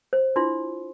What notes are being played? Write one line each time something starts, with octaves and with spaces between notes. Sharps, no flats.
C5
D4 E4 F4 C6